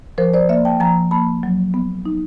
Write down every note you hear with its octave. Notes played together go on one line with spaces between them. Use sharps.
F3 A#4 C5
C5 D5
A#3 D5 E5
G5 A5
F3 G#5 A#5
A#3 A5 B5
F#3
B3
D#4